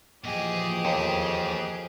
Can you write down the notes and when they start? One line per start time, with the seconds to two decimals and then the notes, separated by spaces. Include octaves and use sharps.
0.24 A#2 E3 F3 G4 G#4 D#5
0.85 D#2 A4 C5